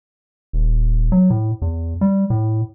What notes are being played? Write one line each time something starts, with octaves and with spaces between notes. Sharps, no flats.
D#1
F#3
A2
E2
G3
A2